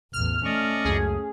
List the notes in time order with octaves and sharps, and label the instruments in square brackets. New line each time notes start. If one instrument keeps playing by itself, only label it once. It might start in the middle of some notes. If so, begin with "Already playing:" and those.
[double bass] A1 E2 [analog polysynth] F6
[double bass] A3 C#4 [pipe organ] D5 D#5 C#6
[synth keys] C#2 F#2 [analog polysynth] G#4